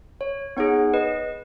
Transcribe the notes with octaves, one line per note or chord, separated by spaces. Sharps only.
C#5
B3 D#4 G#4 C#5 F#5
B4 D#5